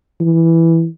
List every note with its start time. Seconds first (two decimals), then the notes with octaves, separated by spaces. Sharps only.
0.20 E3